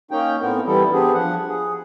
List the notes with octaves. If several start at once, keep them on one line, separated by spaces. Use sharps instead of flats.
A#3 C#4 D#4 G5
A2 B3 C4 A#4
E3 G3 E4 A4
B3 C4 D4 G4 G#4
F3 F#5
G#4